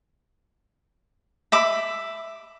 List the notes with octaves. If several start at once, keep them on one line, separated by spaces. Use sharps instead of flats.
E5 B5 D6